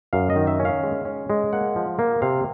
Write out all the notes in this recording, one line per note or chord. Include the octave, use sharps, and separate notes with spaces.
F#2 F5
D#5
D#3
E5
C#4
F5
G#3
C#4
G#3
A#3 F#5
F3
A#3
C3 F5